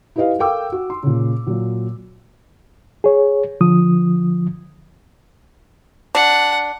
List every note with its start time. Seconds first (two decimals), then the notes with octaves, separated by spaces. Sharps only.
0.16 E4 G4 B4 D#5 F5
0.39 A4 A#4 F5 G5 D6 E6
0.72 F#4
0.90 C6
1.03 A#2 C#3
1.47 A#2 F#3
3.04 G#4 C#5
3.61 D3 F3 D#6
6.15 D4 F#5